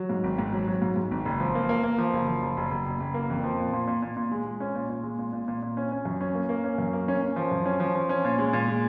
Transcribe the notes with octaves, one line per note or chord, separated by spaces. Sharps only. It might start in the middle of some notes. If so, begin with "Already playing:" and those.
Already playing: F#3
G#2
G#1
G#2
F#3
F#3
G#2
G#2
G#1
F#1
F3
A#3
A#3
A#3
F3
F#1
F3
F#1
F#1
F#1
F#1
F#1
A#3
F2
F3
A#2
A#2
A#2
A#2
A#2
G#3
G#3
C#4
A#2
A#2
G#3
A#2
A#2
A#2
A#2
C#4
C#4
F#2
C#4
A#3
A#3
C#4
F#2
A#3
C#4
C#4
F3
F#2
C#4
F3
F3
C#4
A#2
G#3
A#2
G#3